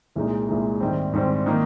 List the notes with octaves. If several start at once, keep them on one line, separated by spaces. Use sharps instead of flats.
C2 A#2 G#3 D#4
C2 A#2 G#3 D#4
G#2 D#3 G3 C4
G#2 D#3 G3 C4
D#3 A#3 D#4